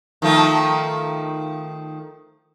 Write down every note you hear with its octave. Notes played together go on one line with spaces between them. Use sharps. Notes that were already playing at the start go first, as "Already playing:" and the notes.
D#3 F3 A3